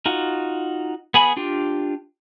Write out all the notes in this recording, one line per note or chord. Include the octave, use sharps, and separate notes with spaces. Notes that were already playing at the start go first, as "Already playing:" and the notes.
D#4 F4 F#4
B3 G#4 G#5 B5
D4 F4 G4